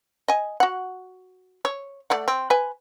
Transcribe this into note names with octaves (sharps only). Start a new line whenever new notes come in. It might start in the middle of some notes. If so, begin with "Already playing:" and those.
D#5 G#5
F#4 F#5
C#5
A3 D5 F#5
C4
B4 G#5